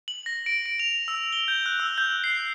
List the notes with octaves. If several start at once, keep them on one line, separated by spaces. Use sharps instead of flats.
F#7
A#6
D7
D7
F7
E6
G7
G6
F#6
E6
G6
C7